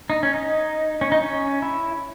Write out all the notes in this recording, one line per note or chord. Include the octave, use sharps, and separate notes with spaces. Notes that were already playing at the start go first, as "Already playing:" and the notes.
D#4
C#4
D#4
C#4
D#4
C#4
E4